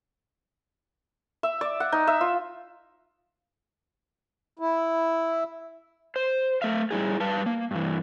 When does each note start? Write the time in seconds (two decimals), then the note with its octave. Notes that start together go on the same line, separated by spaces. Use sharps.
1.43 E5
1.61 D5
1.80 F#5
1.92 D#4
2.07 E5
2.21 F4
4.59 E4
6.16 C5
6.62 A3 E5 F5
6.91 G3 E4 G#4
7.20 G3 B4 F5 A5
7.46 A#3
7.71 G2 E3